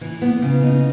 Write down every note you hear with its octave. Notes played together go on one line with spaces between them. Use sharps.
E3
B3
C#3
D#4